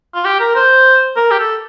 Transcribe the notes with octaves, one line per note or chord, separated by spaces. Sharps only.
F4
G4
A#4
C5
A#4
G4
A4